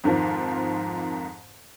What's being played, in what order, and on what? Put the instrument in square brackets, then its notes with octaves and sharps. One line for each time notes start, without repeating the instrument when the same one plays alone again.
[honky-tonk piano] F2 G#2 D#3 F3